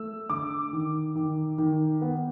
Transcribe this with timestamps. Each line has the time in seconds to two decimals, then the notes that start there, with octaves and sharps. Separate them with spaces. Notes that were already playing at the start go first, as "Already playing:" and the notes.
Already playing: A3 E6
0.30 D3 D6
0.73 D#3
1.15 D#3
1.58 D#3
2.02 B3